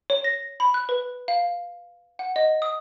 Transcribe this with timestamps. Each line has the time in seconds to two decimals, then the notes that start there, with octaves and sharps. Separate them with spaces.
0.10 C#5
0.24 A#6
0.60 B5
0.74 F#6
0.89 B4
1.28 F5
2.19 F#5
2.36 D#5
2.62 D#6